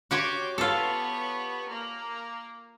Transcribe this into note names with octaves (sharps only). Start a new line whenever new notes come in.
F#4 G4 C#5 C6 D6
B3 F4 G4 A4 C#5
A#3